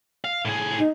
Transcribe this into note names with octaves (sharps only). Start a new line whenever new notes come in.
F5
A2 G#4
D#4